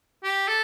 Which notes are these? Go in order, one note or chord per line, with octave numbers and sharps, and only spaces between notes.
G4
A4